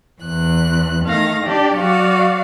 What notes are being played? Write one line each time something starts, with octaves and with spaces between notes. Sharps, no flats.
E2 F#6
D#3 A3 F5 A#6
D4 G4 D5
F#3 F#4 D5 F5